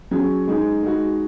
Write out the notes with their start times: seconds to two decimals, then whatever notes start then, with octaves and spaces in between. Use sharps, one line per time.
0.11 F#3 C#4 G#4
0.47 G#3 D#4 G#4
0.83 G#3 D#4 F#4